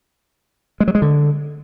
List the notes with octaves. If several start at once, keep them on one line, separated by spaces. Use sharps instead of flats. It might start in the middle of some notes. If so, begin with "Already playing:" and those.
G#3
F#3
G#3
D3